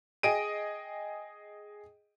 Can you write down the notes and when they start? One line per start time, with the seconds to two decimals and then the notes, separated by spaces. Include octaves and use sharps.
0.23 G#4 D#5 G5 D7 D#7